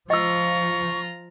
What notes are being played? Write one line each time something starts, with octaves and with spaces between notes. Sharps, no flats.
F3 F4 D#5 A#5 C#6 E6